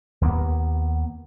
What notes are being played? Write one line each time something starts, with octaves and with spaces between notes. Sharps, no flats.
D#2 A#3 B3